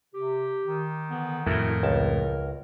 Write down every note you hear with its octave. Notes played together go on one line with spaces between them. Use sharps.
C3 G4
D#3
D3 E3 B3
F2 A2 E4 F#4 A4 A#4
C#2 A5